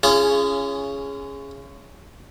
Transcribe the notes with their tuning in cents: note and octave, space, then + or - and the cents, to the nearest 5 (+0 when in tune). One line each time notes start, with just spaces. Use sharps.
C#4 +5 F4 -40 G#4 +0